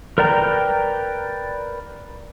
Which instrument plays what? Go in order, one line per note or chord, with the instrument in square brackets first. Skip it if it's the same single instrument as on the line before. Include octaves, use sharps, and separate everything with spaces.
[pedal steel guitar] A#4 B4 D5 G5 A#5